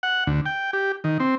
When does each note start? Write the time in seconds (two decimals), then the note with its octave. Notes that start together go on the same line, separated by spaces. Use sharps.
0.03 F#5
0.27 D2
0.46 G5
0.73 G4
1.04 D#3
1.20 C4